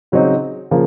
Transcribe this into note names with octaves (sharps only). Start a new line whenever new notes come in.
C#3 F#3 C4 D#4
C#3 F3 A#3